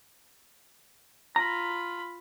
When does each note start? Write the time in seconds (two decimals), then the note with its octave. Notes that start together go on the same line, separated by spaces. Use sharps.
1.36 F4 A#5 B5